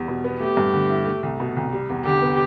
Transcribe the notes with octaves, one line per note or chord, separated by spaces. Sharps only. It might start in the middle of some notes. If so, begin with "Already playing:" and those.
Already playing: E2 G3
B2
B3
A3 G4
G2
D3
E4
A3
C2
B2
C2
G3
E2
D3 G4
B3